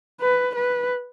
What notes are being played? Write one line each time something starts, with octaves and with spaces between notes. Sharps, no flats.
B4
B4